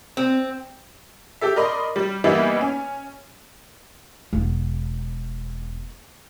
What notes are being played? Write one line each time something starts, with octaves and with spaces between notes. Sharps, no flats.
C4
G4 A4 E5
A#4 D5 D#5 B5 C6
G3
E3 G3 A#3 B3 D#4 E4
C#4
E1 B3